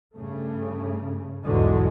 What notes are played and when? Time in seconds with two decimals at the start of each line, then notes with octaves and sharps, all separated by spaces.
0.14 G2 C#3 A3
1.44 B1 E2 G#2 D3 F#3 G#3